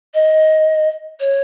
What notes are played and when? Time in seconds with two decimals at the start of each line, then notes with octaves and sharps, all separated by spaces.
0.14 D#5
1.20 C#5